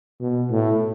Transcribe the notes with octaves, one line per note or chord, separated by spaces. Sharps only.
B2
A2